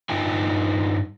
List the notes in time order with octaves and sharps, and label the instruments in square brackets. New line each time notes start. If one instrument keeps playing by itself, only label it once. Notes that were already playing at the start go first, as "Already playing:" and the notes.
[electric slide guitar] G2 D#4 F4 G5 G#5